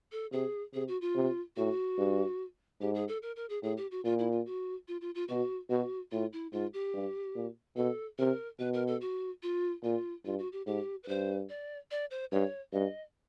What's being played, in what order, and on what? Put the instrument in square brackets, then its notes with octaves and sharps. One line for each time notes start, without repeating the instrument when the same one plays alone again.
[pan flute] A4
[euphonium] C3 [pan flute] G#4
[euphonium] C3 [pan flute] G#4
[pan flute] F#4
F4
[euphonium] C3
[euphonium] A2 [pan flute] F#4
[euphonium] G2
[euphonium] G#2 [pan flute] G4
[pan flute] G#4
A4
A#4
A#4
G#4
[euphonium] A2 [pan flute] G#4
[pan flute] G4
F#4
[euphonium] A#2 [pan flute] F4
[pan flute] E4
F4
F#4
F4
F4
F4
[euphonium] B2 [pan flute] F#4
[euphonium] B2 [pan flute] F#4
[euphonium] A2 [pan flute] F4
[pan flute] E4
[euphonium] G#2 [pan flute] F4
[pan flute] G4
[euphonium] G2
A#2
[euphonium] B2 [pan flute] A4
[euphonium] C3 [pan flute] A#4
[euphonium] B2 [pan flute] B4
[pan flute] A#4
A4
F#4
F4
[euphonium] A#2 [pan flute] F4
[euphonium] G2 [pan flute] F4
[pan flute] F#4
G4
[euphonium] G#2 [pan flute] G4
[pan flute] B4
[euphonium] G2 [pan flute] C5
[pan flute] D5
D5
C5
[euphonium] G2 [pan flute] C#5
[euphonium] G2 [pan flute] D#5